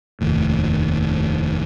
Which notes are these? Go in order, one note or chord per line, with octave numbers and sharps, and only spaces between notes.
F1 D#2 A2